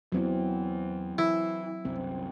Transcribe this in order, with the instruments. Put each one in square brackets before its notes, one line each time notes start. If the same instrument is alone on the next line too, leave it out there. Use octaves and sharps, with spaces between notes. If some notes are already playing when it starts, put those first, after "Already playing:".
[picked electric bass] E2 B3 [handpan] F#3 C4 E4
[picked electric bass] E3 [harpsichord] E4
[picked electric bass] C2 F#2 [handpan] C4